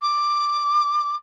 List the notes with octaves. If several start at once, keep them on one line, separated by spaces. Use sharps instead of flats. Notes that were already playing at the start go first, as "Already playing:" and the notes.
D6